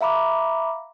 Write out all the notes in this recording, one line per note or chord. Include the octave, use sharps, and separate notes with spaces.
E5 F5 A#5 B5 D6